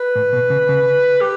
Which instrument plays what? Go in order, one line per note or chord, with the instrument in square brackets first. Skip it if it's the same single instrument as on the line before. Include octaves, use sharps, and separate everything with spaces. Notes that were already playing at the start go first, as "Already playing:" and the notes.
Already playing: [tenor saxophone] B4
[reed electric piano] A2
B2
C#3
C#3
[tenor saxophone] G4